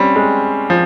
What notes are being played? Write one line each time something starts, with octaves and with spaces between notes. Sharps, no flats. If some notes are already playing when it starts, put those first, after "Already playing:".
Already playing: G3 C4 C#4
G#3
F3